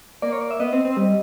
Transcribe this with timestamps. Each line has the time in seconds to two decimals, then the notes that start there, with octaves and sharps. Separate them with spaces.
0.22 A#3 D5
0.32 C#5
0.41 D5
0.51 E5
0.60 B3 D#5
0.72 C4
0.85 C4
0.97 G3